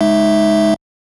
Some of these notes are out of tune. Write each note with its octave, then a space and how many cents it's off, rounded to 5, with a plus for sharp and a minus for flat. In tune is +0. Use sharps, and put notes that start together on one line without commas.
G#3 +10 D#4 +0 E5 +0